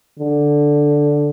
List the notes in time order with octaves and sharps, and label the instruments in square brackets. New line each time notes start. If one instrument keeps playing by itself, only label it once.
[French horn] D3